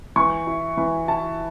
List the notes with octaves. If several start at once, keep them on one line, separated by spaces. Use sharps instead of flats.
E3 C#6
E4
E3
E4 A5